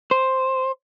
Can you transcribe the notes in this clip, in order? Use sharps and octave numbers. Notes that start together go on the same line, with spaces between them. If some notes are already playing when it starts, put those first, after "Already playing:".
C5